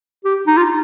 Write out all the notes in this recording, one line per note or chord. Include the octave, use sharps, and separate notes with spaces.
G4
D#4
F4